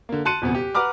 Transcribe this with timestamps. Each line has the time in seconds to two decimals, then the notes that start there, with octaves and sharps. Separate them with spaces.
0.09 D3 A#3
0.25 A5 C6 F#6 C#7 D#7
0.42 D#1 E2 C3 B3
0.55 G4
0.75 B4 F#5 A#5 D6 F6